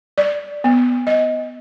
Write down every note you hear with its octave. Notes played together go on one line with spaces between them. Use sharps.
D5
B3
D#5